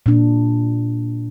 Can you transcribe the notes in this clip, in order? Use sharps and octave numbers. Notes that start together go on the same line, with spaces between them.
A#2 D4